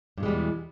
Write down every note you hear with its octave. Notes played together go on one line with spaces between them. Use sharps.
E2 G2 B2 G3 G#3